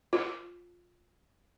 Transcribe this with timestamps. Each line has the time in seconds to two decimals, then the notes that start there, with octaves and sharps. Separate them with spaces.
0.13 F4